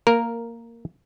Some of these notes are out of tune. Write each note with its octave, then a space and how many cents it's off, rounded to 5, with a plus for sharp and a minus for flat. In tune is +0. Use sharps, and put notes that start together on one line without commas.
A#3 -10 A#4 +0